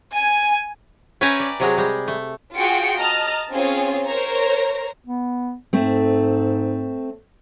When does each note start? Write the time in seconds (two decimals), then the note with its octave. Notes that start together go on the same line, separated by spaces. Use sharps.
0.15 G#5
1.21 C#4 B4 E5 G5 G#5 A#5
1.40 D5
1.60 C3 F#3 G#3
1.78 G3 G#3
2.08 A3
2.56 F4 F#4 G#4 G5 C#7 D7
2.98 D#5 A5 A#5 F6
3.51 C4 C#4 F4 G#4 C#5
4.06 A#4 C5 C#5 A#5
5.07 B3
5.73 G#2 A3 C4